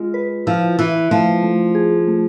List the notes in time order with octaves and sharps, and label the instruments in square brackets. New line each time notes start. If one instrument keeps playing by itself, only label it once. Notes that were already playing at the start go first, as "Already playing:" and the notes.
Already playing: [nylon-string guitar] G#3 [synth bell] F4
[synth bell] B4
[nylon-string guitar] F3 [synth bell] E4
[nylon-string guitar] E3 [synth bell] E4
[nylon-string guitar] F3 [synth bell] A3
[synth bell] A3
G#4
A3